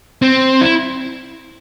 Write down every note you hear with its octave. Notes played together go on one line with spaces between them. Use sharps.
C4
E4